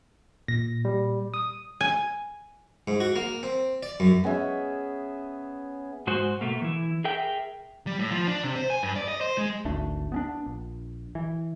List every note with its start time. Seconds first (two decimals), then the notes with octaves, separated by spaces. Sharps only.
0.48 A#2 A#6
0.85 G3
1.34 D#6
1.81 G#5
2.88 G#2
3.00 F#4
3.16 A#3
3.43 C4
3.83 D5
4.00 F#2
4.24 B3 C#4 G#4 E5
6.07 G#2 G#3 F#4 C5
6.41 B2 A3 A#3
6.62 E3 E4
7.04 G#4 A#4 E5 G5
7.87 G3
7.99 A2
8.12 F3
8.27 D4
8.44 C3
8.56 C5
8.70 G#5
8.83 G2
8.96 D5
9.08 D#5
9.21 C5
9.38 G#3
9.65 G#1 D2 A3 D4
10.12 B3 C#4 D4
10.46 A#1
11.15 E3